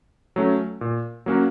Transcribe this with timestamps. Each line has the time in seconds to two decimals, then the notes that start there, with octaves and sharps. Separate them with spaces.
0.36 F#3 A3 C#4
0.81 A#2
1.26 F#3 A#3 C#4 F#4